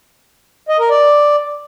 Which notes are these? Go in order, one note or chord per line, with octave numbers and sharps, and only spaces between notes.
D#5
A#4
D5